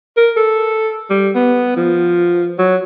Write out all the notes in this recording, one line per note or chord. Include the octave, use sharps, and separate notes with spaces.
A#4
A4
G3
B3
F3
F#3